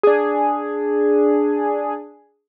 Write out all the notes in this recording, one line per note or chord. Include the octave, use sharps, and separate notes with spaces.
D4 G#4